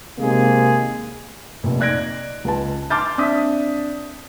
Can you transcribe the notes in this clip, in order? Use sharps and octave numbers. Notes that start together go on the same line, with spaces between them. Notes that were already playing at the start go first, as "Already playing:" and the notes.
C3 D#3 G#3 A#3 G#4
F1 A#1
D#4 D5 F#6 G#6 A#6 D7
C#2 B4 A5
A5 C6 D6 F6 G6 A6
C4 D4 E5 D#6 B6